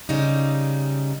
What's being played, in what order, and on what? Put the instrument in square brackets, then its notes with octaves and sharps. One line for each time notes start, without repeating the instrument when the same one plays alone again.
[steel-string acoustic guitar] C#3 G3 D#4